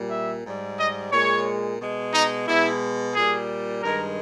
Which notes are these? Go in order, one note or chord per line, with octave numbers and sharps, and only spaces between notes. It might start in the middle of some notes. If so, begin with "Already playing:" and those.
Already playing: A#2 G3
E5
G#2 G3
D#5
A#2 G#3 C#5
B2 G#3
D#4
B2 G#3 E4
A#2 G3 G#4
G2 D#3 G#3 A#4